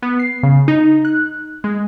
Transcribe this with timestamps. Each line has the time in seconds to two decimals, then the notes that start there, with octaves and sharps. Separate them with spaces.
0.02 B3
0.19 C7
0.43 C#3
0.68 D#4
1.05 F#6
1.64 G#3